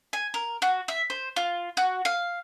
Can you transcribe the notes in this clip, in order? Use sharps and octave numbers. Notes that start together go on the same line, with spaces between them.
G#5
A#4
F#4
E5
C5
F4
F#4
F5